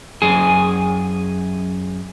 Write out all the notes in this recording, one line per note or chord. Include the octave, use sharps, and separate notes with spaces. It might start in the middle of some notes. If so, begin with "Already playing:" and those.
F#2 G#4